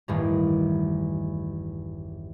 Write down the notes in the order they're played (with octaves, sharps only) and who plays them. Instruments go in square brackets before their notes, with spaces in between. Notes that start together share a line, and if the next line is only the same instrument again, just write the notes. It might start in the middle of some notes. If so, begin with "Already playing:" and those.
[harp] A1 E2 G2 D#3